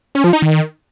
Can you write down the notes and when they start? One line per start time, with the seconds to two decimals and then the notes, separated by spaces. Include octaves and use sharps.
0.15 C#4
0.24 F3
0.33 D#4
0.42 D#3